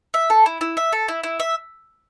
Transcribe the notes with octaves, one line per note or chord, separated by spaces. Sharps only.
E5
A4
E4
E4
E5
A4
E4
E4
E5